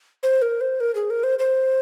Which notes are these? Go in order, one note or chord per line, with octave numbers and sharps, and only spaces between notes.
C5
A#4
C5
A#4
G#4
A#4
C5
C5